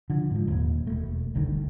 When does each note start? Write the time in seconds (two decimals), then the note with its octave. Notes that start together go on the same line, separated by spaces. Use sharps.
0.10 D3 F3
0.31 G#2 F3
0.48 D#1 D#2
0.87 E1 A3
1.35 G1 D2 G2 D#3